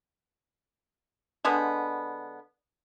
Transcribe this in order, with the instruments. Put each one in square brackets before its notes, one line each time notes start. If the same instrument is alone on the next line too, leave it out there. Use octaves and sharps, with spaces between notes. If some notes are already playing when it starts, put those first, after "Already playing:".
[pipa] D3 G#3 B3